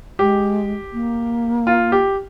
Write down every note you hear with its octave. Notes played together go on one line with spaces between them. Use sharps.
G#3 G4
A#3
F4
G4